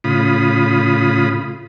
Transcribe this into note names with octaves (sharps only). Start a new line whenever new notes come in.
A2 C#3 F4 B5 D#6